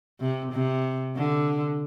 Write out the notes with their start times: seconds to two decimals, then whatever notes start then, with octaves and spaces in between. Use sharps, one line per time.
0.20 C3
0.52 C3
1.16 D3